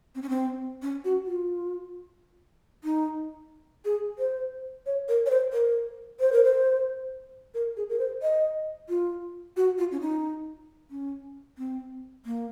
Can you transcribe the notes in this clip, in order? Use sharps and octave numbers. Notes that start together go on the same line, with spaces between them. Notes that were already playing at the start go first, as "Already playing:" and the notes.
C4
C#4
C4
C#4
F#4
F4
D#4
G#4
C5
C#5
A#4
C#5
C5
A#4
C5
A#4
C5
A#4
G#4
A#4
C5
D#5
F4
F#4
F4
C#4
D#4
C#4
C4
A#3